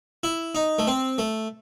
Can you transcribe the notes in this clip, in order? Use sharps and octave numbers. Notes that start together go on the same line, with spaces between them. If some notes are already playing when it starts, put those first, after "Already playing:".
E4
D#4
A3
C4
A3